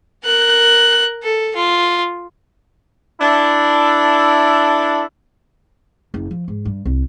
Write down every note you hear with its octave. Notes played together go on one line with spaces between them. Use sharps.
A#4 F#6
A4
F4
D4 E4 A4
F#1
F3
G#2
G2
C2